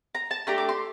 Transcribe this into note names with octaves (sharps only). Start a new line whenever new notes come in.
A#5
A5
A3 D4 G4 A#5
D6
C6